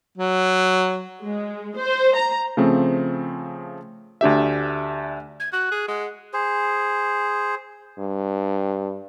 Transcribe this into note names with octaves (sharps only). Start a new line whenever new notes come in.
F#3
G#3
C5
A#5
C#3 F3 A3 C4
D2 D4 G4 E5
G#6
F#4 F#6
G#4
G#3 F#5
G#4 C5
G2